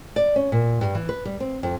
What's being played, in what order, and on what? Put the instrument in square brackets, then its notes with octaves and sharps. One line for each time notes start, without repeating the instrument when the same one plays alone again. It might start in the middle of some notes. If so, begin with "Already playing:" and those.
[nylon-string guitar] D5
C#4
A#2
G2
E3
B4
G3
C4
F2